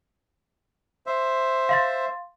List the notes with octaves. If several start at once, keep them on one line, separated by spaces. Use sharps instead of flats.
C5 E5
F5 C6 A6